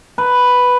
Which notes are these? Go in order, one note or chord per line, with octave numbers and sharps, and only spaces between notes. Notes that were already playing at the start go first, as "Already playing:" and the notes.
B4